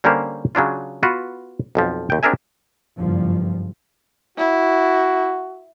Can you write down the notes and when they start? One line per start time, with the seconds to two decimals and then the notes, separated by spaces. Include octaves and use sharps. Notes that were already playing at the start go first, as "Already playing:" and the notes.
0.04 D3 G3 A#3 C#4 A#4 C5
0.55 C#3 F#3 D4 F4
1.03 B3 F4 F#4 B4
1.75 B1 F2 F3
2.10 D#2 G5
2.23 C4 D4 G#4 A#4 E5 G#5
2.97 F#1 G2 F3
4.38 E4 F#4